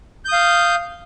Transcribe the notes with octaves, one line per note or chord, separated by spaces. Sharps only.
F5 D#6 G6